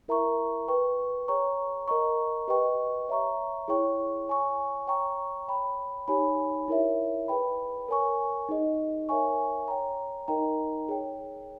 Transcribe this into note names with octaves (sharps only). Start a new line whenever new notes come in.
E4 A#4 E5 A#5 C#6
B4 G5 C#6
G#4 C#5 G5 A#5 C#6
A#4 D#5 A#5 C#6
G4 B4 D#5 G5 C#6
C#5 E5 A#5 C#6
E4 G#4 C#5 G5 C#6
C#5 G#5 C#6
C#5 G5 A#5 C#6
C#5 G5 B5
D#4 G4 C#5 G#5 B5
E4 A#4 C#5 E5
G#4 B4 G5 B5
A#4 C#5 G#5 C#6
D#4 G#4 D#5
A#4 C#5 E5 G#5 C#6
C#5 G5 A#5
D#4 A#4 D#5 G5 A#5
G#4 C#5 G5